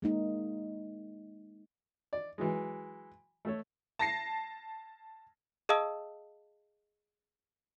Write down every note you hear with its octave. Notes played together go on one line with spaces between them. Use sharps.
G#3 A#3 D#4
D5
E3 F#3 G#3
A3 A4 C#5
A5 A#6 C7
G#4 D#5 F5 A5 D#6 E6